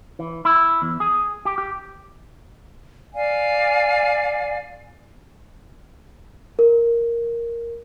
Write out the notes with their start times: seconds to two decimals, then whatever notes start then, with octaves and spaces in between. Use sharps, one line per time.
0.19 E3
0.45 E4
0.82 E2
1.00 G#4
1.45 G4
1.58 G4
3.14 D5 F5 G#5
6.59 A#4